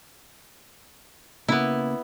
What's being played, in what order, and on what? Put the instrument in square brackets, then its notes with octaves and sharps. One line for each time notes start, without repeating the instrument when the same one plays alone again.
[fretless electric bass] C#3 A#3 [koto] B3 E4